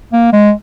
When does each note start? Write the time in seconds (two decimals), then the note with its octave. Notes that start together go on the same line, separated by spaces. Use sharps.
0.12 A#3
0.33 G#3